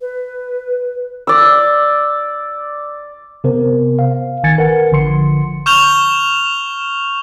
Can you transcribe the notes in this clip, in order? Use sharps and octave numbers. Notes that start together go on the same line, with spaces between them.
B4
D5 E6
C3 B3 A#4 C5
F5
G1 D#3 G#5 G#6 A6 C#7
A#4 B4 F#5
A1 D3 F3 C6 C#7
C#6 F6 G6 E7 F7 G7